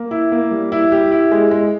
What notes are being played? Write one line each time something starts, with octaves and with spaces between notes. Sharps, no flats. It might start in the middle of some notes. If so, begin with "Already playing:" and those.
Already playing: A#3
E4
A#3
G3
E4
G4
E4
G#3
G#3